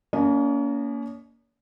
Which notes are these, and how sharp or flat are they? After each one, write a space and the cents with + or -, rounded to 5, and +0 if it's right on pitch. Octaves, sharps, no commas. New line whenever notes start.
A#3 +0 C#4 +35 D#5 -30